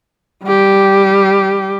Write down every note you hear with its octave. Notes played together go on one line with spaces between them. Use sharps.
G3 G4